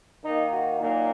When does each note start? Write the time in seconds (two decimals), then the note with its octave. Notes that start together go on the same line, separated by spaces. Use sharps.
0.24 D#3 A#3 D#4
0.52 F#4
0.81 A#2 F#3 A#3 D#4